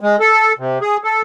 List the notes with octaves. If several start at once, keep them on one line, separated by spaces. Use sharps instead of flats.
G#3
A4
C3
G#4
A4